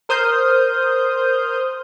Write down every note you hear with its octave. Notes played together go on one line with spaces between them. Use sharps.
A#4 C5 D#6 F6 G6